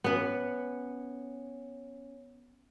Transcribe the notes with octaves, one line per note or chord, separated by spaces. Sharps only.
B3 C#4 B4 C#5 C#7